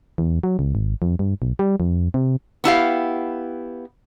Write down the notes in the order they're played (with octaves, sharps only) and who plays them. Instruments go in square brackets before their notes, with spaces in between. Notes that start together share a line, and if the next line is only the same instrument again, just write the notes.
[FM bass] E2
F#3
C#2
G#1
F2
G2
B1
G3
F2
C3
[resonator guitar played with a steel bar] B3 E4 G4 F5